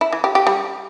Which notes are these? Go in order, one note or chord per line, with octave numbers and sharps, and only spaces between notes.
E4
E3
G4
G4
G3